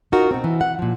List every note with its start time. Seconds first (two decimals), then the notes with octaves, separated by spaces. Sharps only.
0.12 D#4 F4 F#4 A#4
0.31 B2 C4
0.44 E3
0.61 F#5
0.79 A#2 F3